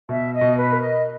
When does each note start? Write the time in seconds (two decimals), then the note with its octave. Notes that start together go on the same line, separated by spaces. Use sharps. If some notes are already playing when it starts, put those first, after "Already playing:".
0.09 B2 E5
0.33 D#5
0.41 B2
0.56 B4
0.72 A#4
0.80 D#5